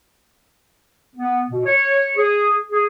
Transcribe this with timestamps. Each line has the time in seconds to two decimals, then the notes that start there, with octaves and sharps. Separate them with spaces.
1.16 B3
1.51 B2
1.65 C#5
2.17 G#4
2.71 G#4